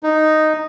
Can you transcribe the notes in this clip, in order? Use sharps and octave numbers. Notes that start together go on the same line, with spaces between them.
D#4